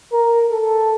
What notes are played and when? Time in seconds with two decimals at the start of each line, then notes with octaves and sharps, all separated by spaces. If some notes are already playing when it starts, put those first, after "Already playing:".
0.12 A#4
0.50 A4